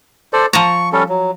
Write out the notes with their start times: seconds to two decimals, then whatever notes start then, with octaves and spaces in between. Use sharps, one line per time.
0.33 A4 C5 D5
0.53 F3 A5 A#5 C#6
0.92 G3 C#4 A4
1.09 F#3